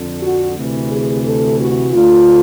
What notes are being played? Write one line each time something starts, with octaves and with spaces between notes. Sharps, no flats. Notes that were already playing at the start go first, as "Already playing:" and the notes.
Already playing: F2 D3
F#4
D2 C3 E3
G#4
A4
F#4
D2 D3 F4